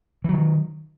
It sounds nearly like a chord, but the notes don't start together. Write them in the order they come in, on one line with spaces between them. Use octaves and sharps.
E3 F#3 D#3